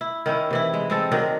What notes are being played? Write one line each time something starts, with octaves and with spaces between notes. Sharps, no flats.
E4
D#3 C#4 E4
C3 E3 E4
G#3
G#3 C4 A4
D#3 F#3 D4